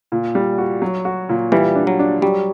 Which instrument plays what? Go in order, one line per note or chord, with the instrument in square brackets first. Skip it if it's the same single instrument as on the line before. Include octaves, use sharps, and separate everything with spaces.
[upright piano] A#2
G3
F#4
F#3
F#4
A#2
[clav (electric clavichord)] E3 [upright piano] G3
[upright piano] D4
[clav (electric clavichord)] F#3
[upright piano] D4
[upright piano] F#3 [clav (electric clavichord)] G3